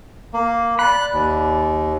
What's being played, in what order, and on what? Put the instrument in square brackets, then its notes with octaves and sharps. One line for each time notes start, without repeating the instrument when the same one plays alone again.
[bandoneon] A#3
[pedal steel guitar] D5 B5 [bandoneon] F#6
[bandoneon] D#2